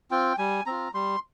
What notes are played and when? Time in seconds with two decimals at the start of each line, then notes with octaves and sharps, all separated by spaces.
0.11 C4 F4 G5
0.38 G3 G#5
0.66 C4 F4 A#5
0.94 G3 C6